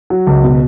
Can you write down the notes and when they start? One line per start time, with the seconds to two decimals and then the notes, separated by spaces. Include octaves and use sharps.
0.10 F#3
0.27 C#2
0.43 B2